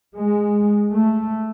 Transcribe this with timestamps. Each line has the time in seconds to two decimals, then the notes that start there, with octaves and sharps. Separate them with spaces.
0.15 G#3
0.91 A3